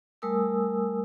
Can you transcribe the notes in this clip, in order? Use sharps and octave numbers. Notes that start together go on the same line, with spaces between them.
G3 A3 A#4 G#5 D#6 E6